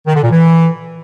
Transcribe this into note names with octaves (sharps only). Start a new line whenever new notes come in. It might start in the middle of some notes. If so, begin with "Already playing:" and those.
D#3
D3
A#2
E3